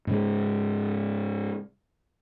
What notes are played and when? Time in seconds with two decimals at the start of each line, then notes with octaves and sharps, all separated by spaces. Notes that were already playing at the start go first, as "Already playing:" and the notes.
0.07 G#2 C#3 G#3